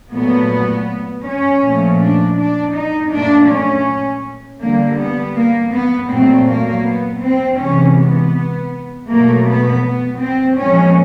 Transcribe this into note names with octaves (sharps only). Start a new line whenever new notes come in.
A#2 F#3 A3 B3
C#4
A#2 F3 A3
D4
D4
D#4
A#2 F#3 A3 D4
C#4
D3 G3 A#3
B3
A#3
B3
A#2 F#3 A3 C4
A#3
B3
C4
C3 E3 G#3 C#4
B3
B2 F#3 A3 A#3
B3
B3
C4
A#2 F3 G#3 C#4